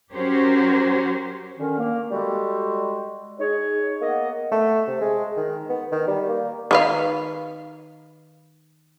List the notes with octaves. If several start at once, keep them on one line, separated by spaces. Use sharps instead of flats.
F#3 C#4 F#4 G4 A#4 C5
D3 D#3 C#4
A#3
G3 G#3 F#4 A4
D#4 G#4 C#5
A#3 B3 D#5
A3
C3
G#3
D#3
B3
D#3
G3
A#3
D#3 B4 F5